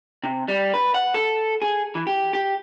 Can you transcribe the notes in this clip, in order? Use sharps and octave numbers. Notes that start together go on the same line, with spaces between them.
C3
G3
B4
F#5
A4
G#4
E3
G4
G4